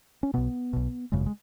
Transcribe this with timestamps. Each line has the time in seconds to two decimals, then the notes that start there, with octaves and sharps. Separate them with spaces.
0.23 C#4
0.34 B1 B2 B3
0.73 B1 B2
1.12 G#1 F#2 C#3 G#3
1.26 G#3